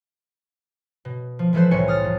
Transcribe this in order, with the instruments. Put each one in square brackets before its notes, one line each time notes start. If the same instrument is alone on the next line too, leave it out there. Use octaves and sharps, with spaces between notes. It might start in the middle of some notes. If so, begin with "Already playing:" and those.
[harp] B2
F3
E3 F3 G#3 A4 B4 C5
C2 A2 C#5 G#5 C6 C#7
D#6 F6 A6
F2